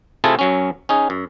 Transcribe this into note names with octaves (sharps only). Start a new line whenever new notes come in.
C3 A3 E4 F4 G#4 A5
F#2 F#3 C#4
C#4 D#4 G#4
F#2